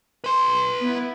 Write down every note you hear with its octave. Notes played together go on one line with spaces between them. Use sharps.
B4 C6
B3 E4